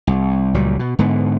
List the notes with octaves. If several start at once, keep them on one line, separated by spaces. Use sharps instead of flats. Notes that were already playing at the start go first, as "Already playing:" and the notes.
C2
C#2 A#2 F#3 G3
B2
G#2 D3 B3